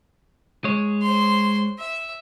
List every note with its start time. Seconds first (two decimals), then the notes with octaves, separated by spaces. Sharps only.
0.64 G#3 C#5
1.02 C5 C6
1.79 E5